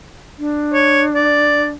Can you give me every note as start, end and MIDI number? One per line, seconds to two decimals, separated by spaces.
0.39 1.72 62
0.73 1.03 73
1.15 1.67 74